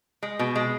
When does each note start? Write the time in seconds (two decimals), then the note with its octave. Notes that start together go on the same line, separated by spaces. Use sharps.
0.23 G#3
0.39 B2
0.56 G#3